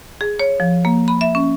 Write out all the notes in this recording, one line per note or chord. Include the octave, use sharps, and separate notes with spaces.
G#4
C#5
F3
A#3
B5
E5
C#4